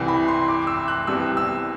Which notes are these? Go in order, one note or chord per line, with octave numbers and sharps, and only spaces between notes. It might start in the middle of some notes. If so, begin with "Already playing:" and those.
Already playing: C2 C3 E3
B5
C6
D6
D6
E6
F#6
C2 C3 G3 B3 E6
E6